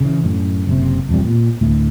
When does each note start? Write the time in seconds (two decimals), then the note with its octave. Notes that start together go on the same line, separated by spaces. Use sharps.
0.01 C#3 E3
0.24 F#2 A2
0.67 F#1 C3
1.09 E1 F2 C3 G3
1.25 A#2
1.61 D2 A2